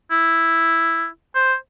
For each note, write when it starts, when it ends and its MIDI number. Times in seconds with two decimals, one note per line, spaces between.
0.11 1.07 64
1.35 1.55 72